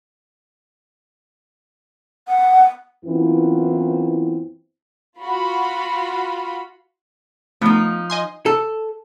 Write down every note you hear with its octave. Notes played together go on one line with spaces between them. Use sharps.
F#5
F#2 E3 B3 C4 E4 F4
F4 F#4 B5
F3 A3 B3 D#4
D#5 G#5 C6
A4